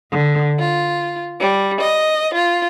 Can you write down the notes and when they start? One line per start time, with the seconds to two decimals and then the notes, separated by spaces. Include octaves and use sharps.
0.11 D3
0.59 F4
1.40 G3
1.80 D#5
2.34 F4